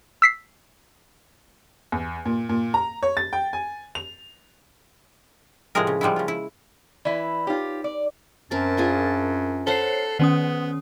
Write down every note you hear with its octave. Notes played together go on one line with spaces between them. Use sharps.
E6 B6 C7
E2
A#2
A#2
A#5
C#5
A6
G5
G#5
F7
A2 C3 F3 G#3 G#4 A#4
C#3
F3 G3 G#3 B3 E4
C#3 F4
E4
E3 E4 D5
D#4 F4 G4 C#5
D5
F#2 C4 A#4 A5
D4 F4 G#4
A4 C5 C#5 F#5 A5 C6 C7
D#3 B3 C#4 D#6